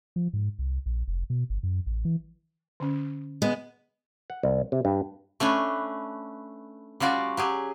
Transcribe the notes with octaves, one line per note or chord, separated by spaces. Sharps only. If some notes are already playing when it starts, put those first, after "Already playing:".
F3
G#2
C2
A#1
F1
B2
G1
F#2
A1
E3
D3 C#4
G#3 B3
F#5
C2
C3
G2
A3 C#4 D4 B4
G3 C#4 F4 F#4 D5
F#3 G4 G#4